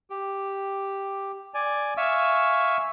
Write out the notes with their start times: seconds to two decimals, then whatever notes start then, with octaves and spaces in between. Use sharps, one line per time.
0.10 G4
1.54 D5 G#5
1.97 E5 F5 G#5 C#6 E6